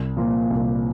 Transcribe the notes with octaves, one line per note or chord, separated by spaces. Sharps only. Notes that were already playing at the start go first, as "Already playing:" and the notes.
Already playing: C2
A#2 F3 A#3 F4
C2